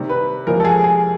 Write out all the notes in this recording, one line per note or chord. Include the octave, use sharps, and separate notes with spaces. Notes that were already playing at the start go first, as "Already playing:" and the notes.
Already playing: C3 D#3 G3
B4
F2 C3 F3 G#3 A#4
A4
G#4
G#4